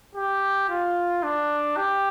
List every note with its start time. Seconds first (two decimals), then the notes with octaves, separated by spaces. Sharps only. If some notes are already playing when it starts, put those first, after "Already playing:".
0.15 G4
0.70 F4
1.23 D4
1.77 G4